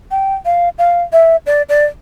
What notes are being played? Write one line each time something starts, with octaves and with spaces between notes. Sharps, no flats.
G5
F5
F5
E5
D5
D5